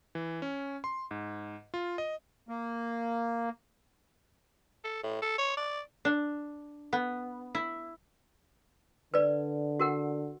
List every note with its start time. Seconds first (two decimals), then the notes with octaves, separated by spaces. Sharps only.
0.15 E3
0.42 C#4
0.84 C6
1.11 G#2
1.74 F4
1.98 D#5
2.49 A#3
4.84 A4
5.03 A2
5.22 A4
5.38 C#5
5.57 D5
6.05 D4
6.93 B3
7.55 E4
9.14 D3 B4 D5
9.80 F#4 A#4 F#5